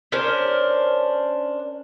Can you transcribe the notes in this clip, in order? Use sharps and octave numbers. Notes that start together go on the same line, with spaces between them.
C#4 D4 A#4 C5